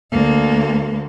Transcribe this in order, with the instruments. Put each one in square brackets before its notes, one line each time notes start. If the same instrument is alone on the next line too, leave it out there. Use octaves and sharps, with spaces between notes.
[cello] D2 A#3